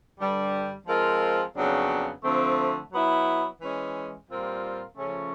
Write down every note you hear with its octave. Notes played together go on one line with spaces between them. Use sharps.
G2 D3 G3
F3 G#3 C4 F4 A#4
F2 C#3 F#3 B3 D4
D3 F3 A3 C4
F#3 B3 E4
E3 G#3 C#4
A#2 G3 C4 F4 A#4
C#3 F3 A3 C#4